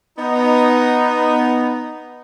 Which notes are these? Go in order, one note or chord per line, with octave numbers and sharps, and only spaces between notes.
B3 D#4